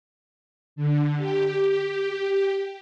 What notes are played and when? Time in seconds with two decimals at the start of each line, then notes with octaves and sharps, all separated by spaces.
0.76 D3
1.17 G4